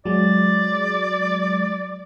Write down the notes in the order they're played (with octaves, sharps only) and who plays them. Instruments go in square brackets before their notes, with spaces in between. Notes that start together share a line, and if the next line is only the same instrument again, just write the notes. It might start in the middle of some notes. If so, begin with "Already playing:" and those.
[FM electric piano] F#3 G#3 [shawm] D5